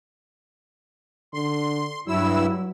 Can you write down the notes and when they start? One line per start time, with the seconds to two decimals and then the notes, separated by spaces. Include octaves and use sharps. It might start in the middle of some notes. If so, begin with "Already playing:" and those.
1.34 D3 C6
2.08 G2 F#3 E4 E6